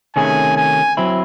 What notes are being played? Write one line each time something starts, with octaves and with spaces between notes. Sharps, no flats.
C3 D#3 A3 C#4 G#4 G#5
G#5
F#3 C4 E4